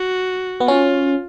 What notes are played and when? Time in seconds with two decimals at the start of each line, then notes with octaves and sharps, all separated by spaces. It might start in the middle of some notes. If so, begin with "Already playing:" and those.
Already playing: F#4
0.60 B3
0.68 C#4 F4